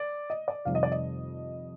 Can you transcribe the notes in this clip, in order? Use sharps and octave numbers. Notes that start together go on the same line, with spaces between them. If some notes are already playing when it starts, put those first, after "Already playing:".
Already playing: D5
D#5
D5
F1 F2 D#3 G3 F5
D#5
D5
D#5